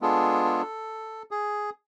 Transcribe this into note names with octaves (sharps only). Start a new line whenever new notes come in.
G#3 B3 D4 F4 G#4 A4
A4
G#4